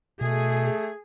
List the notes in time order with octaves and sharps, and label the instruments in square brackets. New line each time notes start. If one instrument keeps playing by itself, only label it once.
[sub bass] B2 [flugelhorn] A3 [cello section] G#4